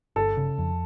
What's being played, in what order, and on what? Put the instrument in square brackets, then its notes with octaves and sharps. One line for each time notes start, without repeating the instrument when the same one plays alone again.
[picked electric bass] G1 [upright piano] A4
[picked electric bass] C#3
F2